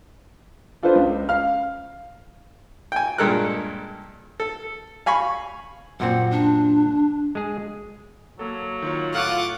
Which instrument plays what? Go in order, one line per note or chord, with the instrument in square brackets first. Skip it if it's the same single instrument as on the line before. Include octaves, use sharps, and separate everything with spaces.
[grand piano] D4 F4 A4 B4 C5
C#2
F5 F6
[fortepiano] G5 G#5
G2 A#2 G#3 A4 A#4 F#6
A4
F5 G#5 B5 C#6
[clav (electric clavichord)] F#2 A#2 C4 [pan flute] F#5
[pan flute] D4
[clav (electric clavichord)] G#3 G#4
[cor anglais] F#3 [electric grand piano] A#3 A4
[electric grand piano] D#3 F4 C#5
[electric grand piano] A2 A4 C#6 [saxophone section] F4 [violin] F#5 D6